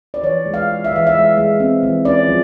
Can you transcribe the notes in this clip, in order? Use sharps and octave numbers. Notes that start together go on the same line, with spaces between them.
D5
E3 C#5
G#3
F5
G#3
E5
E3 F5
E5
G#3
G#3
C4
E3
C#4 D5
F3